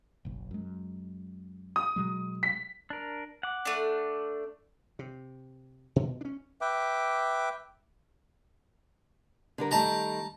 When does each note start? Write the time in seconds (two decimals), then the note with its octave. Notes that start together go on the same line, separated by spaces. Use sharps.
0.25 F#1 B1
0.51 F#2 G#3
1.76 D#6
1.96 B2 F#3 G#3
2.43 B6
2.90 D4 A#4
3.43 F#5 D6
3.65 A3 D4
4.99 C3
5.96 B2
6.21 C#4 D4
6.61 B4 E5 G5 D6
9.58 D3 G3 A#4
9.71 D#3 G3 A3 A5 A#5